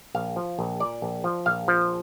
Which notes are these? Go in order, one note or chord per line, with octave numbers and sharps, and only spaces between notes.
A#1 F5
F3
A#1
A#2 D5
A#1
F3
A#1 F5
F3